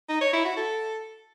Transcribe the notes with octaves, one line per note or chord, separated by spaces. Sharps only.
D#4
C#5
E4
F#4
A4